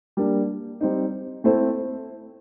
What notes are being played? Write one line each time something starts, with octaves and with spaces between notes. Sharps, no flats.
G3 A#3 D4
G3 C4 D#4
A3 C4 E4 A4 C5